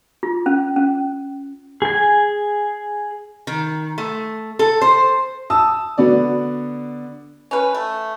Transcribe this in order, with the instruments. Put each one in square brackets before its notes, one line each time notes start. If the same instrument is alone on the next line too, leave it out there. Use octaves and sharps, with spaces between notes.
[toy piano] F4
C#4
C#4
[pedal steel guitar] G#4 G#5
[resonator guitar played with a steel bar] D#3
A3
A4
C5
[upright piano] A5 D#6 E6
D3 B3 F#4 D5
[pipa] C#4 B4
A3